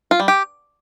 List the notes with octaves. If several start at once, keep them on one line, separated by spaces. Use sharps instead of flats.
F4
G3
G4